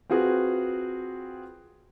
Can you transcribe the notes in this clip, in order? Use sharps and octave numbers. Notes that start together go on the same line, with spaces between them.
C4 F4 F#4 G#4 B4